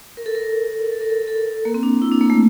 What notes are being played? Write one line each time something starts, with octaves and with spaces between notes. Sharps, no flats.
A#4
A4
A#4
A4
A#4
A4
A4
A#3
C4
D4
E4
D4
A#3
A3